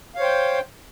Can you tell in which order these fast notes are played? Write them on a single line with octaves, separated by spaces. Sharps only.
F5 C#5 C5 G5